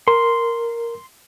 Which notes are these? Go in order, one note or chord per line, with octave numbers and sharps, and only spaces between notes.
A#4 C6